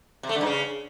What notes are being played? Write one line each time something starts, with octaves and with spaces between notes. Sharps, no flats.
C3
A3
D3
G2
C#3